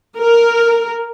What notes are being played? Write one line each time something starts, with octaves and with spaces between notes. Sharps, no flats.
A#4